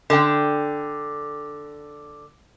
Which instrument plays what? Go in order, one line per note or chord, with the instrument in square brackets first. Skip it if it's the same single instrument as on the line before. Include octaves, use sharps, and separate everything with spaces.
[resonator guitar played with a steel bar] D3 G5